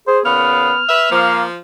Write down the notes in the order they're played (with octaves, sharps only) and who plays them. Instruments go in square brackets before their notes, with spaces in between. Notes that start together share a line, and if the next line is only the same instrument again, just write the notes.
[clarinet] G#4 [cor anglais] C5
[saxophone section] A#2 C#3 [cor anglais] B3 [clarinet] F6
[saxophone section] B4 E5
[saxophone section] F3 [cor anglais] A#3